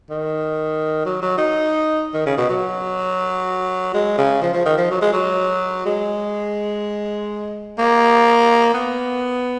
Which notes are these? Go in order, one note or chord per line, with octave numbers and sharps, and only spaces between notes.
D#3
F#3
F#3
D#4
D#3
C#3
B2
F#3
G#3
C#3
F3
F3
D#3
F3
F#3
G#3
F#3
G#3
A#3
B3